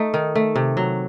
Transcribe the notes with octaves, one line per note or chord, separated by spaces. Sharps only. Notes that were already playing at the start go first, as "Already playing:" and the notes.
Already playing: A3 D#4 A4
D#3
A3
C3
F#3